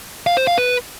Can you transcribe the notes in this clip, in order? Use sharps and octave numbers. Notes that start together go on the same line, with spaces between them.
F5
C5
F5
B4